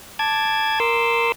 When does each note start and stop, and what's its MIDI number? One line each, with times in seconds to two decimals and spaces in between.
0.19 0.79 81
0.19 0.79 86
0.19 0.79 92
0.80 1.32 70
0.80 1.32 84
0.80 1.32 86
0.80 1.32 88